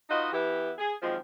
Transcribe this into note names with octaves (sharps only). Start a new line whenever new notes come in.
D#4 F4 F#4 B4 D#5
E3 B3 E4 G4
G#4
F#2 D#3 F3 G#3 C4 F4